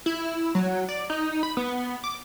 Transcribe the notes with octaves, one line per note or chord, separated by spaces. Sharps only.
E4
F#3
D5
D#4
B5
B3
D6